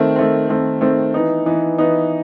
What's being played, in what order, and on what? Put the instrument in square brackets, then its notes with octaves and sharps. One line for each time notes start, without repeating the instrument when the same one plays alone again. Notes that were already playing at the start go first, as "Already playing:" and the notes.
Already playing: [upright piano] D#3 A3 C4
D#3 A3 C4
D#3 A3 C4
D#3 A3 C4
E3 B3 D#4
E3 B3 D#4
E3 B3 D#4